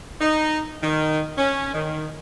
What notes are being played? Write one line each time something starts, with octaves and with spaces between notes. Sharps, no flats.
D#4
D#3
C#4
D#3